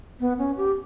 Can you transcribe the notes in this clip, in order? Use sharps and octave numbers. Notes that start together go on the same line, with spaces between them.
B3
C#4
G4